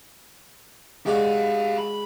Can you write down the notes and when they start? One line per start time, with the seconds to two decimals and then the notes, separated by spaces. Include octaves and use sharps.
1.06 G#3 F#4 G4 D5 F5
1.78 B5